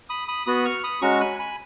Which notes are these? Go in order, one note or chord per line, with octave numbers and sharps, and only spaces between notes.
B5 D#6
B5 D#6
B3 F#4 B5 D#6
C#6 F6
B5 D#6
G#3 C#4 F#4 A#5 C#6
G#5 B5
G#5 B5